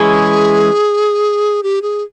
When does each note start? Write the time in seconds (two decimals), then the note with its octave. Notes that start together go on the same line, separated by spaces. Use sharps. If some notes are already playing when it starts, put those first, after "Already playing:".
Already playing: E3 G#3 C#4 E4 G#4
1.63 G4
1.82 G#4